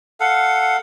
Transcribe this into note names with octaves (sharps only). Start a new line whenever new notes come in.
A4 F5 F#5